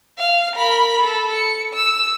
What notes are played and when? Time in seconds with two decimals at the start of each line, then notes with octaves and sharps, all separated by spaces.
0.19 F5
0.55 A#4 B5
1.00 A4
1.32 C#7
1.74 E6